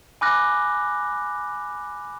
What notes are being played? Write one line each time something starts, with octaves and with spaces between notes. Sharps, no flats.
G#5 B5 D6 F6 F#6 A#6